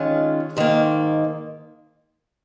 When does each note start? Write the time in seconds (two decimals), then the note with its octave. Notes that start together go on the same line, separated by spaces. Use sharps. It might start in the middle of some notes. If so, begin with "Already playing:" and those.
Already playing: D#3 G#3 C#4 F4
0.57 G#2 D#3 A#3